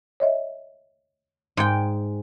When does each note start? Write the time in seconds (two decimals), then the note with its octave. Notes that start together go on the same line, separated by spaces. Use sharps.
0.20 C#5 D#5 E5
1.57 G#2 G5